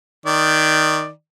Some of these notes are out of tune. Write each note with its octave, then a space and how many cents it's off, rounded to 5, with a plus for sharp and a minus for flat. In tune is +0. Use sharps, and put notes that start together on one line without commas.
D#3 +0 D5 +5